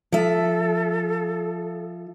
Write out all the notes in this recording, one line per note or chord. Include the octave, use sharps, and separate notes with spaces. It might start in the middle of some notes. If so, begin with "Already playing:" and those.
F3 A4 E5